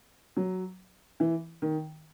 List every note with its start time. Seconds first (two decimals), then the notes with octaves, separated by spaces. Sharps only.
0.37 F#3
1.20 E3
1.62 D#3